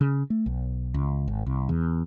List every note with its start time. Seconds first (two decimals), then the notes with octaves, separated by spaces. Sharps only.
0.01 C#3
0.30 A3
0.46 B1
0.94 C#2
1.28 G#1
1.46 C2
1.69 E2